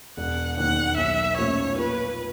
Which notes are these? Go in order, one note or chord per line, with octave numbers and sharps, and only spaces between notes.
E1 F#5
D#2 D#3 F#5
B1 E5
A#2 F3 A3 C#4 C#5
A#2 B4